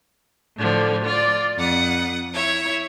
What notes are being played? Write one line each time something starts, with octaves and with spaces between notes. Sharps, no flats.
A2 D3 F3
F4 D5
F2 F#5 D#6
E4 C#5 E5 G#6